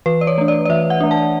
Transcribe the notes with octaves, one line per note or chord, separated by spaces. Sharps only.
E3 B4
D5
C#5
A3 D4
D5
D5
E3 E5
F#5
A3 D4
A5